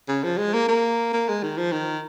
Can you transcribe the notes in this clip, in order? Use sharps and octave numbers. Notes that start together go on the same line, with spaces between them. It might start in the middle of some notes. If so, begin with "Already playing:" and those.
C#3
F3
G#3
A#3
A#3
A#3
G#3
D#3
F3
D#3